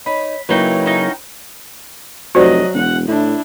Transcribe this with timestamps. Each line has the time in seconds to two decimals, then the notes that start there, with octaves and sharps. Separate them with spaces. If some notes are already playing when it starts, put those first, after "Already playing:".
0.06 D#4 C#5 B5
0.49 C#3 F#3 A#3 D#4 E4 B4 C#5 G5
0.86 C#4 D#4 F#4
2.35 F1 F#3 F#4 C5 D5 D#5
2.74 E1 F#5
3.08 A2 D4 E4